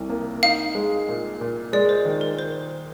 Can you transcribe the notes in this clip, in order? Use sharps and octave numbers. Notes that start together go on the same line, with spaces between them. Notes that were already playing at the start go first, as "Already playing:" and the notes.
Already playing: C2 C3
A#3
D#4 F5
G#3
A#2
A#2
G#3 D5
C5
D#3
A#4
C5